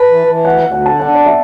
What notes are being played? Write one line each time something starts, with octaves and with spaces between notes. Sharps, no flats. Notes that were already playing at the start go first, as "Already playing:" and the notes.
Already playing: B4 A5
E3
E3
D2 F#5
D2
F#5
D3 A5
D4 F#5
F#2 D5
E5